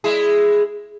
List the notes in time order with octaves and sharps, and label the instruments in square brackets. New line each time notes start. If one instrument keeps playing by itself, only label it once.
[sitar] G#3 E4 G#4